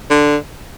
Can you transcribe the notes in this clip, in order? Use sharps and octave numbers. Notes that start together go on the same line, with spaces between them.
D3